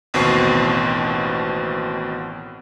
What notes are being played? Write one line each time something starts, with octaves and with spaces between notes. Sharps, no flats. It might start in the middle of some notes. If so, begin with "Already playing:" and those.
A1 D#2 B2 C4 C#6 C7